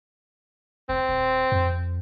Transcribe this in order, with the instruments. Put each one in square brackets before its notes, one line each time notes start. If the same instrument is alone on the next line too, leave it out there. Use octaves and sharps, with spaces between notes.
[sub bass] F1 [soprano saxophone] C4
[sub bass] D#1
F2